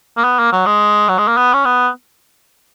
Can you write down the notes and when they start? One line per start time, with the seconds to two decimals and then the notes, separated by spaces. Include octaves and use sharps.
0.17 A#3
0.24 B3
0.39 A#3
0.53 F#3
0.66 G#3
1.08 F#3
1.18 G#3
1.28 A#3
1.37 B3
1.54 C#4
1.65 B3